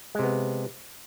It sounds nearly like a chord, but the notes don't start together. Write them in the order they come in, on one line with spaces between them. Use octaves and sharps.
G#3 C3 B3